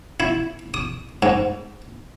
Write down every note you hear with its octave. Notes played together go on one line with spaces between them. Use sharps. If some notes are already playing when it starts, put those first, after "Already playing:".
E4
D#6
G#2